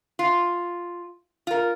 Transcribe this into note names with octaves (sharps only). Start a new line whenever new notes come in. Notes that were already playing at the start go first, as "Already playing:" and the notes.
F4
F4 A#4